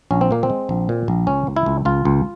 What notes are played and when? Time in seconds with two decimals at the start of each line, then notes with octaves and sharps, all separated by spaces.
0.11 A#1 C#4
0.21 C4
0.31 A#2 A#3
0.43 C4
0.50 G#3
0.69 A#1
0.89 A#2
1.08 A#1
1.27 C#2 C#4
1.47 C#2
1.56 E4
1.66 C#2
1.85 C#2 F4
2.05 C#2